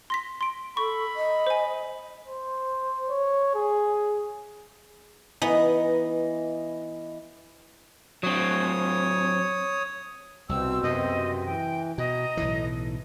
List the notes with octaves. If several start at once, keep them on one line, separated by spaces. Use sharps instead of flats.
C6 A#6 B6
C6 D7
A4 B5 C#6
D#5
C5 G#5
C5
C#5
G#4
E3 B3 D#4 D#5
F#3 C4 C#5 D#6
C2 B2 C4 E6
F#2 C3 D#5
E3 G5
B2 D#5 A#5
B1 A2 E3